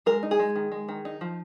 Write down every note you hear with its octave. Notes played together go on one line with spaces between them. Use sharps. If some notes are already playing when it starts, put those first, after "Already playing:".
G#3 A#4
D#4
G#4
G#3
D#3
G#3
D#3
D#4
F3